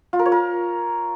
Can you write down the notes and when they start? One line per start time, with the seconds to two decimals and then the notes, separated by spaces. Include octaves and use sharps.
0.13 F4
0.19 A#4
0.26 C#5
0.32 A#4